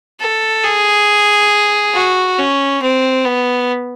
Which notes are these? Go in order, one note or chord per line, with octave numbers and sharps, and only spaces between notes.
A4
G#4
F#4
C#4
C4
B3